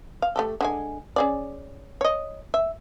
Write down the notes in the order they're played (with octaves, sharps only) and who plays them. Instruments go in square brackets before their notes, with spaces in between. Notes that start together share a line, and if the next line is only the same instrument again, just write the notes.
[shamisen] F5
A3 G4 A4
D3 G#3 G#5
C#4 G#4 D5
C#5 D#5
E5